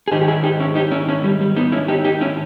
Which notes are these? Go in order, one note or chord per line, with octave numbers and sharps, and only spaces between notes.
G#4
G#2 D#3 D#4 G4
G4
E4 G#4
D#4 G4
C#4 E4
D#4 G4
C#4 E4
C#4 E4
G3
G3
B3 D#4
C#4 E4
D#4 G4
D#4 G4
C#4 E4